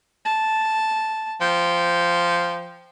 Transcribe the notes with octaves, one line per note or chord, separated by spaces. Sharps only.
A5
F3 G5